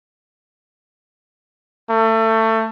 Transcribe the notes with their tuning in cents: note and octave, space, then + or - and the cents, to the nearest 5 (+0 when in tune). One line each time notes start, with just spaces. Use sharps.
A3 +25